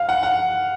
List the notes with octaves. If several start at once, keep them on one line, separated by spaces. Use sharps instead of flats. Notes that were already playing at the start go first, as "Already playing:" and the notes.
Already playing: F5
F#5
F#5